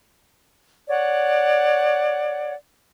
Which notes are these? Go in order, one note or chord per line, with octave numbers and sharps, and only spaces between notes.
C#5 D5 F#5